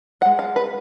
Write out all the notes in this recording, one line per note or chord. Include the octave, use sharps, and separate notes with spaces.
D#4 F#5
G#3
F5
B4